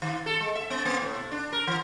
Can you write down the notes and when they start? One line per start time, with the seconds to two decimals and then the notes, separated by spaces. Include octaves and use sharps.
0.02 D#3
0.26 A4
0.41 G#3
0.55 E5
0.70 B3
0.85 A#3
1.02 A2
1.15 B2
1.31 D4
1.52 A#4
1.67 E3